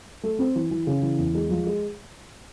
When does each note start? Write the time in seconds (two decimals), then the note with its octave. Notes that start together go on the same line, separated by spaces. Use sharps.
0.23 A3
0.39 C4
0.56 E3
0.71 E3
0.87 C#3
1.02 E3
1.18 E2
1.35 G#3
1.50 F3
1.67 G#3